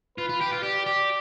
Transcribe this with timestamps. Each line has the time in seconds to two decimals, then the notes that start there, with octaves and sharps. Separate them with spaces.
0.18 F4 B4
0.29 F4
0.41 G4
0.53 F4
0.63 G4 D5
0.86 G4